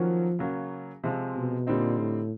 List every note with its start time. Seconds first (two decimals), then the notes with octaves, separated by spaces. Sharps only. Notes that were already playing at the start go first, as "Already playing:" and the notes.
Already playing: D#3 F3 F#3 A#3 C#4 F#4
0.39 C#3 F#3 A#3
1.04 C3 F3 G#3 C4
1.36 B2
1.67 A#2 D3 G3 C4 D#4
1.99 A2